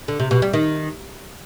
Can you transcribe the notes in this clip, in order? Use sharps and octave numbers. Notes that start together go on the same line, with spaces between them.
D3
C3
B2
G3
D#3